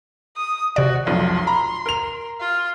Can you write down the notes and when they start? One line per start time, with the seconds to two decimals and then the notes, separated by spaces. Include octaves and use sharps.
0.36 D#6
0.76 C3 F#4 D5
1.06 F1 B1 F3 C6
1.47 A#5 B5
1.86 A#4 F7
2.40 F4